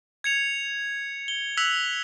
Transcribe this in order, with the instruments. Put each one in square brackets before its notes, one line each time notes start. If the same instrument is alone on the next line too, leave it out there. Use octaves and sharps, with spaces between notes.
[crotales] G#6 C#7 F7
G7
E6 F#6 B6 F7 F#7